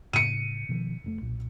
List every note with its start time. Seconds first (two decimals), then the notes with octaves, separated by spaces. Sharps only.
0.13 A2 C#3 C#7 D#7
0.69 B2 D#3 F3
1.04 F1 A#2 A3
1.21 B1 A#2